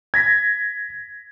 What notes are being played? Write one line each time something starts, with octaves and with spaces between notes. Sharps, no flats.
G#6 A#6 B6